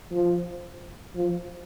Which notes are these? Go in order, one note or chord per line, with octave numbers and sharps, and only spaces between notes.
F3
F3